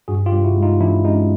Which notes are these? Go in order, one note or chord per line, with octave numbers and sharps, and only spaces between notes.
G2 F#4 G#4
F4 G4
G2
E4 F#4
G#3
D#4 F4
E3 D4 E4
G#3 C#4 D#4